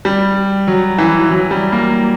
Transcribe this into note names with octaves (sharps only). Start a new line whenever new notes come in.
G3
F#3
E3
F#3
G3
A#3